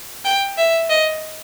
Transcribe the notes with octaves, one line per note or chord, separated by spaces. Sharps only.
G5
E5
D#5